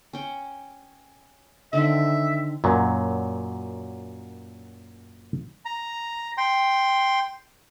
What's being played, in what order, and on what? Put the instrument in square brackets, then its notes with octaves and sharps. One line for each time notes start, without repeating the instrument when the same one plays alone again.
[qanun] C#4 G5
[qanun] D3 D#3 C4 [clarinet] E5
[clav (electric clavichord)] F#2 A#2 F#3
[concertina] A#5
G5 C6